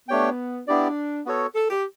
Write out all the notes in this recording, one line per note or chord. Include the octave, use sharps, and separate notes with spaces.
A3 B3 D4 G4 C#5 G5
B3 D4 E4 G4 D5
B3 F#4 A4 C#5
A4
G4